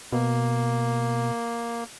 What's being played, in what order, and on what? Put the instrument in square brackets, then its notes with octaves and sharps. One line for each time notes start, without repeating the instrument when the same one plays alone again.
[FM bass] B2 [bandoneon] A#3